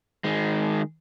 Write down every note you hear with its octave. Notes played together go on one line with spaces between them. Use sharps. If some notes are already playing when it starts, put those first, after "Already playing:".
D#3 G#3